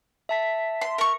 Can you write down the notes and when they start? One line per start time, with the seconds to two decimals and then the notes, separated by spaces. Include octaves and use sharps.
0.29 E5 A5 B6
0.81 C6
0.98 A#4 C#6